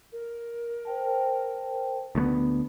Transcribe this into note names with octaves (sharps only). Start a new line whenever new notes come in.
A#4
C5 G5 A5
D2 A3 B3